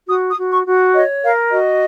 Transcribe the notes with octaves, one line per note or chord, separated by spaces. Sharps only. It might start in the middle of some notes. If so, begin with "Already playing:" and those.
F#4 D#6
D#6
F#4
C#6
F#4
C#5 D#5
A#4 F5
F#4 D#5